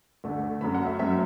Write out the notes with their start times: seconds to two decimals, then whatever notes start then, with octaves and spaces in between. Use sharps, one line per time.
0.24 D2 D3 A3
0.61 F#2 F#3 A3 B5
0.75 F#5
0.87 E5
0.99 F#2 F#3 A3 E5